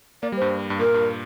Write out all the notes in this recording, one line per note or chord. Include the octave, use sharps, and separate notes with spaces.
A#3 D5
G3
G2 C5
G2
A#2 A#4
G2